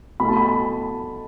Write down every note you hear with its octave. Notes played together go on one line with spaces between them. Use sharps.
B2 A3 B5
A5
B5